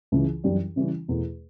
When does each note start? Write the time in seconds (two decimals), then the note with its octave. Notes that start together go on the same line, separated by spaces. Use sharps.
0.12 C#2 C#3 E3
0.44 F#2 E3 G3 D4 G4
0.76 C#3 E3 G3 C#4
1.08 E2 B2 A3